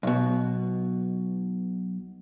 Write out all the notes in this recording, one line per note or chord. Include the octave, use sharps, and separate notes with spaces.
B1 B2